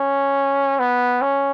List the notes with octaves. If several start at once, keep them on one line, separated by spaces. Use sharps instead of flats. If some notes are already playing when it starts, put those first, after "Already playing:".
Already playing: C#4
B3
C#4